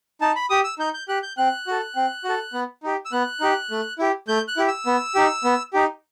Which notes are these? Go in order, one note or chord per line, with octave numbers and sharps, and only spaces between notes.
D#4 A5
B5
G4 D#6
E6
D#4 G6
G6
G4 F#6
G6
C4 F#6
F#4 A4
C4
F#4 A4
B3
D#4 G4
E6
B3 F#6
D#4 G4
A3
E4 G4
A3 G6
F#6
E4 G4
E6
B3
D#4 G4
B3
D#4 G4